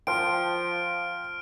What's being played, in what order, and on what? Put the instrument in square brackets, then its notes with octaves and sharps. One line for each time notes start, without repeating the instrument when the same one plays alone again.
[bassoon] F3 [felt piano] G5 A5 C6 [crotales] F6 D7